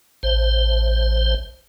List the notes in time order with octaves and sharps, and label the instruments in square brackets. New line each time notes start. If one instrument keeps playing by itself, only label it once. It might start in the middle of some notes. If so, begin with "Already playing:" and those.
[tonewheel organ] A1 C5